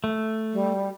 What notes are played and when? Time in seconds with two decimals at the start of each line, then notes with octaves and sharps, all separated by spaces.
0.04 A3
0.53 G3